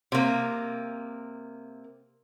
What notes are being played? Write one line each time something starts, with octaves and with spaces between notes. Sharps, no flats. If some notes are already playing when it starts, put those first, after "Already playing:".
C3 A#3